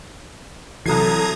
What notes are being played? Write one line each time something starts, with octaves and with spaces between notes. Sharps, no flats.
C2 E3 F#3 A4 A#5 D#6 G#6 C7